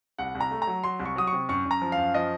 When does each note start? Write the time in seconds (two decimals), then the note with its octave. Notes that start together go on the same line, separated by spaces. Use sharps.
0.18 C2 F#5
0.35 C2
0.40 A#5
0.51 A3
0.62 A#5
0.67 F#3
0.84 F#3 C6
0.99 C2
1.05 C#6
1.16 F#3 D#6
1.27 C#6
1.32 C3
1.49 F#2 C#6
1.66 F#2
1.71 A#5
1.82 F3
1.92 F5
1.97 F#2
2.14 F3 D#5